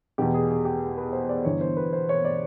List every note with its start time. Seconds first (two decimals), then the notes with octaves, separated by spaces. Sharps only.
0.18 E2 B2 G4
0.34 G#4
0.50 G#4
0.65 G4
0.97 B4
1.13 C5
1.29 D5
1.45 G1 G2 E3 C#5
1.61 C5
1.77 B4
1.93 C5
2.09 C#5
2.25 D5